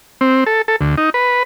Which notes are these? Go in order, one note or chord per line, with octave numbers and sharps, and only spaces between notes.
C4
A4
A4
D2
D#4
B4